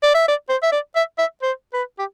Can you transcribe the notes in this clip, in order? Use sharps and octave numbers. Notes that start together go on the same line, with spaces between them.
D5
E5
D5
C5
E5
D5
E5
E5
C5
B4
G4